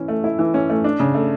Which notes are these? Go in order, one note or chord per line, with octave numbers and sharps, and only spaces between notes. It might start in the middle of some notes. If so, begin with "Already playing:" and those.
Already playing: E3 C#4 E4
A3
E4
E3
C#4
A3
D4
C#3
A3